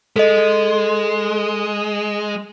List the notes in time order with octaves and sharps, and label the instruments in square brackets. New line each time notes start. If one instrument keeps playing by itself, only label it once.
[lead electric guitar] G#3 [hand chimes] A4 D#5